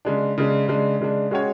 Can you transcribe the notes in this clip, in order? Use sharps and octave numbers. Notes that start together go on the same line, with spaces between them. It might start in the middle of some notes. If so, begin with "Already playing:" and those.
C#3 G#3 D4
C#3 G#3 D4
C#3 G#3 D4
C#3 G#3 D4
G#3 C#4 F#4 C#5